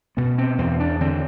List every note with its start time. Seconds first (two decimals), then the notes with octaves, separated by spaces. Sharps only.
0.17 B2 B3
0.38 C4
0.58 E2 C4
0.80 D4
1.01 D3 C4